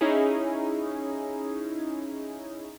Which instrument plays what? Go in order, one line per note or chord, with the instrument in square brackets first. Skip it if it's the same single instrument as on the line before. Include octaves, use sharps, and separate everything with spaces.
[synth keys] C#4 D#4 E4 G#4